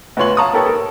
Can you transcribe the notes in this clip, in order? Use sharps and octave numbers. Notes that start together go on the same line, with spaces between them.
D2 B3 F4 C#5 C6 F#7
F5 A5 A#5 C#6 D#6
A#3 G4 A4 B4 C#5
A4 A#4